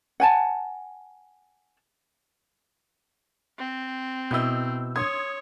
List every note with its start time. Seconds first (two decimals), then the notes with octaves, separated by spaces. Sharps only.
0.20 F#5 G#5 A5
3.58 C4
4.31 B2 E4 D#5 E6 G6
4.96 C#5 C6 D#6 G#6